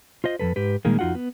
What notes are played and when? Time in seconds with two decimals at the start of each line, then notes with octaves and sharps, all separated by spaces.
0.24 F4 C5 D#5
0.40 F2 C3 A4 B4
0.56 G#2 G4 B4
0.85 A#2 D#3 G3 G#3 A#3
0.99 F2 D#4 F4 F#4 F#5
1.15 B3